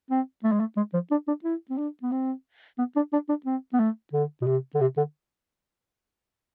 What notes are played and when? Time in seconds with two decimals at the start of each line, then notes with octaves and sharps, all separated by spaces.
0.10 C4
0.44 A3
0.52 G#3
0.60 A3
0.77 G#3
0.94 F3
1.11 D4
1.28 D4
1.44 E4
1.70 C4
1.78 D4
2.03 B3
2.12 C4
2.78 B3
2.96 D4
3.13 D4
3.29 D4
3.46 C4
3.73 B3
3.80 A3
4.13 D3
4.42 B2
4.47 C3
4.75 D3
4.81 C3
4.97 D3